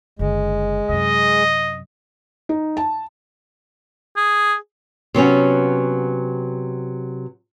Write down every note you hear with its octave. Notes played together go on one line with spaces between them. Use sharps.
F#1 D3 G#3
F#2 C3 D#5
D#4
A5
G#4
C3 F#3 B3 C#4